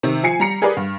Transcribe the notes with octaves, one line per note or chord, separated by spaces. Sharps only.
C3 D#3
F3 G#5 C7 C#7
G3 A#5 C#7
G4 G#4 A#4 B4 D5
G2